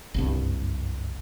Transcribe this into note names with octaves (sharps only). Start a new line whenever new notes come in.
F#1 C2 G2